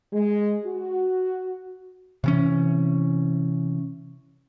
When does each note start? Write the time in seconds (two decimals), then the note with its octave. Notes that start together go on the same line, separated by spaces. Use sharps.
0.13 G#3
0.65 F#4
2.24 C3 E3 C#4